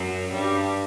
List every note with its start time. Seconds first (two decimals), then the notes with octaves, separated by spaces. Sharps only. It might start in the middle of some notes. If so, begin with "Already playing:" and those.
Already playing: F#2 F#3
0.32 G2 G3